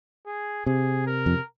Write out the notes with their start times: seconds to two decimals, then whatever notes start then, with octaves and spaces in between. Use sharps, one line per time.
0.26 G#4
0.66 C3 G#4
1.07 A#4
1.26 F2